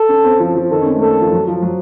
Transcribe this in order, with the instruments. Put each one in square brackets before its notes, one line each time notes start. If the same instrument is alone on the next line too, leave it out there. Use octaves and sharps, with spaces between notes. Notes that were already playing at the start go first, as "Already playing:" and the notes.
Already playing: [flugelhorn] A4
[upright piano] C#4
C4
F3
F3
[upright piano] D#3 [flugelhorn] A4
[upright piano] C#4
C4
A3
[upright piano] A#3 [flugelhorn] A4
[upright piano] F3
F#3
F3
F#3